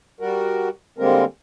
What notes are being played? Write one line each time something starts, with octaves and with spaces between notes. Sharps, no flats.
G3 F#4 A#4
D3 G3 G#3 A#3 C4 A#4